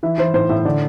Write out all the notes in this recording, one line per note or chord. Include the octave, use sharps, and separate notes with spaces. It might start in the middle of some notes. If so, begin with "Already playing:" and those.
E3 E5
E3 C5
A2 C5
A2 E5
D3 D5